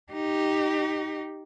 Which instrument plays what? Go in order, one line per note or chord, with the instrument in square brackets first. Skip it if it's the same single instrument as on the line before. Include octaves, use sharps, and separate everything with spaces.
[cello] D#4 G4